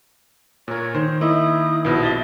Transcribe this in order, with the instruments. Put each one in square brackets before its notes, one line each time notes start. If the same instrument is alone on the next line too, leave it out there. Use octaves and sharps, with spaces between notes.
[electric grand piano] A#2 A#4 [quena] C#5
[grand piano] D#3 [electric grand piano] C5
[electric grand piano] A#3 D#5 [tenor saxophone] E4 [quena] D#6
[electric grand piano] A#1 B2 F3 [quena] E4 [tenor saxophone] B4
[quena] E5 [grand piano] A6 A#6 G7